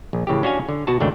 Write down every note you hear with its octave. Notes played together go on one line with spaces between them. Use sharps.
A#1
A2 C#3 E3 G4
C#4 D4 F#4 C#5 F5 G#5
D3
B2 F#4 A5
G#1 C#2 A3 D4 G5